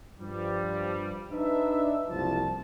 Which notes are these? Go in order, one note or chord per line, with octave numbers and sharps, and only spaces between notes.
G2 F3 G3
D4 D#4 B4 E5
F#1 C2 F3 A5